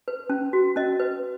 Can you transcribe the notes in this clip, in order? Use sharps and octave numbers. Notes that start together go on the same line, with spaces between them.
B4
C#4
F#4
C#4 D#5
B4